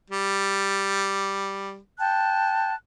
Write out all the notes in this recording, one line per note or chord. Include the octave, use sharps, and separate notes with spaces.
G3
G5 A5 F#6